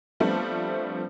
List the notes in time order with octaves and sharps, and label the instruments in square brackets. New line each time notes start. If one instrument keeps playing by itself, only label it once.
[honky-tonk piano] F3 G3 A3 B3 C4 D4